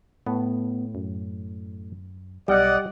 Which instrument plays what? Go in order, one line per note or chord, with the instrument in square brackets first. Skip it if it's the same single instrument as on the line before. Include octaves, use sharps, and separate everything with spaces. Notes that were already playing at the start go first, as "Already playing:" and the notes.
[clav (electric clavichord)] A2 [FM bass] B3
[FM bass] F#2
[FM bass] B1 [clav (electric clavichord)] G3 [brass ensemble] D5 D#5 F#5